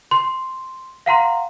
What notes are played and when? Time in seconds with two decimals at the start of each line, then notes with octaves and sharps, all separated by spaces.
0.11 C6
1.06 F5 F#5 A#5 C6